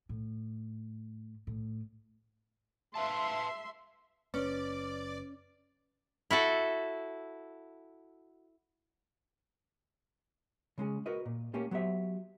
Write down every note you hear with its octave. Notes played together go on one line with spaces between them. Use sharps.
A2
A2
B4 E5 F5 A5 C6
F#1 C#4 B4 D5
E4 F#4 A4
C#3 G#3 C#4 G#4
F#4 A#4 B4 D#5
A#2
A3 A#3 C#4 G4
F#3 B3 G4 C5 C#5 E5